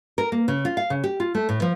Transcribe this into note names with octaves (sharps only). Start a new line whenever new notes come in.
A#4
A#3
C#3
F4
F5
C#3
G4
F4
A3
A2
F3